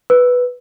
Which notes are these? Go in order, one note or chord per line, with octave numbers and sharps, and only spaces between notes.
B4